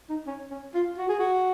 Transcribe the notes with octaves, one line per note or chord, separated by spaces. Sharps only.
D#4
C#4
C#4
F4
F#4
G#4
F#4